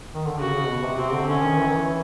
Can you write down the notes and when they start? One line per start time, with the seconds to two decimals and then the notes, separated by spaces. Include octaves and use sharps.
0.14 D#3
0.26 D3
0.38 C#3 F#4
0.53 C#3
0.68 B2
0.83 C3
0.97 C3 C4
1.13 D3
1.27 D3 C#4
1.42 D#3
1.57 E3
1.67 D#3
1.76 E3